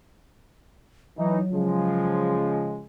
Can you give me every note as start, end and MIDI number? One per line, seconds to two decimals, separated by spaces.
1.17 1.39 52
1.17 2.36 54
1.17 1.39 63
1.51 2.84 49
1.51 2.84 53
1.51 2.84 56